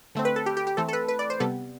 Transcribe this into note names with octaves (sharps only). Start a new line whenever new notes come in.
D3 A3 C4
B4
A4
G4
G4
G4
E3 A3 C4 A4
A4
B4
B4
D5
C5
C3 G3 B3 A4